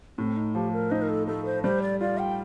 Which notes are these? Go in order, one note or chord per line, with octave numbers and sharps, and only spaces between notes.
A2 C4
D#4
F3 G4
A#4
D#4 C5
A#4
A4
A3 A4
C5
G3 C5
D5
F4 D5
G5